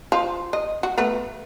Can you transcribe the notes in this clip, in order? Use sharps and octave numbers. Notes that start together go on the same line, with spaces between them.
F3
D#5
F#4
A3 B3 B4